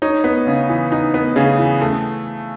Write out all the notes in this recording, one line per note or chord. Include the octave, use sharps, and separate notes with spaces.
D#4 C#5
B3
C#3
E3
D#4
B3
C#3 G#4
E3
A3